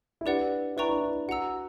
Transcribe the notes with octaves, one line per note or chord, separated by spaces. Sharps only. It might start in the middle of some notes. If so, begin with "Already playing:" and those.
E4
D4 G4 B4 D5 F#5
E4 B4 D5 G5 A#5 C#6
D4
E4
F#4 F#5 A#5 E6